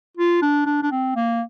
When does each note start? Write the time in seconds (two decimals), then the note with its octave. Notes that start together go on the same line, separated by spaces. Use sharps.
0.17 F4
0.42 D4
0.66 D4
0.82 D4
0.91 C4
1.16 A#3